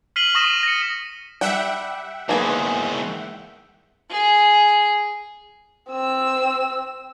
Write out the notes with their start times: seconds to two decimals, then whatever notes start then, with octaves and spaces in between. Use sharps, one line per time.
0.16 F6 B6 C7 D#7 F#7 G7
0.35 C#6 D#6 A#6 D#7 E7
0.63 A#6 C#7
1.41 G3 E5 F#5 G5
2.29 E2 G#2 A#3 G#4 B4
4.11 G#4
5.90 C4 E6